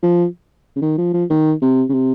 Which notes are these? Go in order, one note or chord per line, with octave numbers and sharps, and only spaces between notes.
F3
C#3
D#3
F3
F3
D#3
C3
C#3
C3